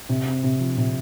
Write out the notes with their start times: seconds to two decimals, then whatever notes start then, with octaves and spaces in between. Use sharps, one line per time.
0.09 C3
0.25 C4
0.44 C3
0.59 F3
0.78 C3